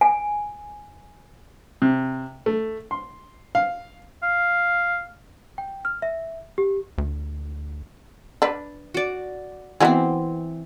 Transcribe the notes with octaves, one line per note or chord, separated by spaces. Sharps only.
G#5
C3
A3
C6
F5
F5
G5
F6
E5
G4
D2
D4 B4
F#4 D5
E3 B3 C4 F#4 G#4